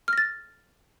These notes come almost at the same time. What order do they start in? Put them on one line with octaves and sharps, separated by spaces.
F6 A#6 A6